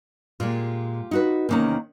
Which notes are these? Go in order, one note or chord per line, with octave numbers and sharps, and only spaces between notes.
A#2 G#3 F4 G4
D#4 F#4 B4
E2 C3 D#3 A#3 C#4 A#5